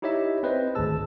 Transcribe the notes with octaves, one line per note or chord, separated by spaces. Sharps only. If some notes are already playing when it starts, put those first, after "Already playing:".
D#4 E4 G4 C#5 D#5 E5
C4 B4 C5 D#5
G#1 D2 G#4 A5 E6